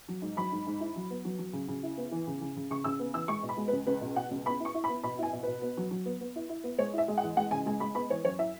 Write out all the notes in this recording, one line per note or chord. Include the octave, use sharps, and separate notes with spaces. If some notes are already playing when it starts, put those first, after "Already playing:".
F#3
G#2
F#3 B5
G#2
G#2
E4
F#3
B3
F#3
F#3
C#3
C#3
E4
B3
E3
C#3
C#3
C#3
C#3 C#6
C#3 E6
B3
E3 E6
G#3 C#6
B2
B5
G#3
B4
C#2
C#2 B4
B2
B2 F#5
C#2
B3 B5
E4
C#6
E4
B5
B3
B2 B5
E4 G#5
B2
B2 B4
B3
F#3
F#3
B3
B3
E4
E4
B3
G#3 C#5
E4 E5
G#3
F#5
E2
G#3 F#5
C#3 G#5
G#3 G#5
G#3 B5
B3 B5
E3 C#5
F#2 C#5
E4 E5